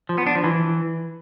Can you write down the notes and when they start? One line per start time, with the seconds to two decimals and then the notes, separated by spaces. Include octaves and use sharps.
0.09 F3
0.18 B3
0.27 D4
0.35 F3
0.44 E3